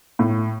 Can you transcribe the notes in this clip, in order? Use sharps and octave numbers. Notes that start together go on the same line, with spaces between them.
A2